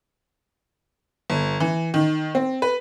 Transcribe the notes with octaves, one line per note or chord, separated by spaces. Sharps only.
G1
E3
D#3
C4
B4